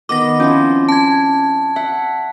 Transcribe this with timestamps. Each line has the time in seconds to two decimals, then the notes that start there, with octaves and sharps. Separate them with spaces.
0.09 D#3 B3 D#5 D6 A#6
0.40 F3 C4 C#4 E4
0.89 A5 G#6
1.76 E5 F#5